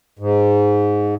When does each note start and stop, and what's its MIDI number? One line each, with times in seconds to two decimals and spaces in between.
0.19 1.15 44